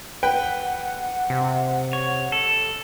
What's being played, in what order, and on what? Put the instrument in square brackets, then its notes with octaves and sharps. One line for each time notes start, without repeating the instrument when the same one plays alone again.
[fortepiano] B4 G5 [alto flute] F#5
[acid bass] C3
[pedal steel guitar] C#5
A4